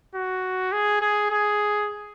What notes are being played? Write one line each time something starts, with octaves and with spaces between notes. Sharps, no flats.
F#4
G#4
G#4
G#4